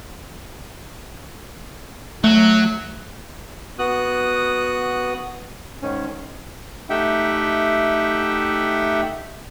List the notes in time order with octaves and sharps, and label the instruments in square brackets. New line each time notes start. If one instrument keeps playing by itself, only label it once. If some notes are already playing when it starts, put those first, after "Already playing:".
[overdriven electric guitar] F#3 [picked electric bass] A3
[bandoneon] B3 F#4 D#6 F#6
G#2 D#3 C#4
A3 D#4 G4 E5 F#5 G5